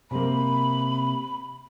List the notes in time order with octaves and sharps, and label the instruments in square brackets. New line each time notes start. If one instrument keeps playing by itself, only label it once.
[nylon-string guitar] C3 A#3 [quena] B5